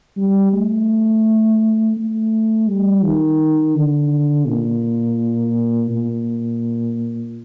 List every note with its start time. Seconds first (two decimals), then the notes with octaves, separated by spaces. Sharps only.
0.17 G3
0.53 A3
1.96 A3
2.68 G3
3.04 D#3
3.75 D3
4.47 A#2
5.91 A#2